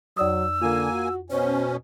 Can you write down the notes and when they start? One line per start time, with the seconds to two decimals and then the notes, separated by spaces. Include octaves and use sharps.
0.17 F2 F#3 D5 D#6 E6
0.62 D3 A#3 F4 G#5
0.92 F#4
1.30 B2 C#4 C5 C#5